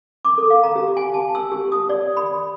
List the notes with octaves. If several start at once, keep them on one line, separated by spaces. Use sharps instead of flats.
D6
A4
F5
A#5
G4
G#5
A5
E6
G4
D#6
D5
B5